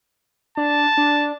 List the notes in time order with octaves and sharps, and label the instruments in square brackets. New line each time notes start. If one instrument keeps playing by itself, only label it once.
[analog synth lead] D4 [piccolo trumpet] A5
[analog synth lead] D4